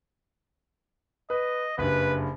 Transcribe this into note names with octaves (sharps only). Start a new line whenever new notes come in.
B4 D#5
F#1 G2 B4